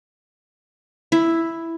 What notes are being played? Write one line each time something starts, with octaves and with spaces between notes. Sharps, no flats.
E4